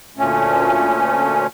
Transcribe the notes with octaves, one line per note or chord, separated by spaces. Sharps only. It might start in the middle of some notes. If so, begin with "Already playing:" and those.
D2 A#2 A3 C#4